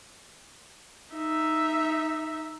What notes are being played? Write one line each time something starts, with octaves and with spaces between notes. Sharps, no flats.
D#4 E5